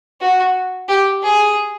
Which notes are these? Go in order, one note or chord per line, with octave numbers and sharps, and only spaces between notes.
F#4
G4
G#4